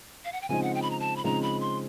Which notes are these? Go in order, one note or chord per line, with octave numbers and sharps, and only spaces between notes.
F5
F#5
G5
C#3 F3 G#3 C4 D#4 G#5
F#5
G5
B5
A#5
A5
B5
C#3 F3 G#3 C4 D#4 A#5
B5
C6